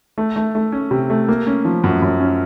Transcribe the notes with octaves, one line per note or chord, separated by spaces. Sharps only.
A3
A3
A3
C#4
C3
A3
A#3
C#4
F3
F#2
F#2
C#4